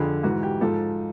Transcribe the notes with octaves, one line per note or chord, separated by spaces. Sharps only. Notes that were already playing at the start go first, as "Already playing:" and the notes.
Already playing: F2 D3 F3 G#4
G#2 E3 F#4
G4
G#2 F3 A4